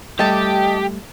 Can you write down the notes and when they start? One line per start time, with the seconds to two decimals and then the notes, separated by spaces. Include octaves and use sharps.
0.19 G3 A3 G4 D#5 A5